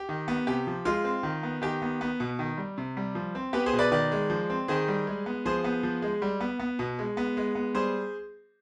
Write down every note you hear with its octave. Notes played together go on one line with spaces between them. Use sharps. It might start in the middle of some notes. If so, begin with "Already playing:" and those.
Already playing: G4
D#3
B3
C3 G4
F3
G#3 F4
C4
D#3
B3
D#3 G4
B3
B3
B2
D#3
G3
C3
G3
F3
C4
B3 G4 B4
G#4 C5
B2
B4 D5
D#3 B4 D5
G#3
F3
C4
D#3 G#4 C5
G3
G#3
B3
F3 G#4 C5
B3
F3
G#3
G3
B3
B3
B2
G#3
B3
G#3
B3
G3 G#4 C5